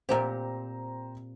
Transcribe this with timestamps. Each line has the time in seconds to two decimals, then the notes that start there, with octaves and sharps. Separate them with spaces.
0.09 A#2 C4 G4 C5 G5 A#5